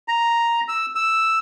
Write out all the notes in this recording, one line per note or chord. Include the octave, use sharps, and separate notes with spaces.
A#5
E6
E6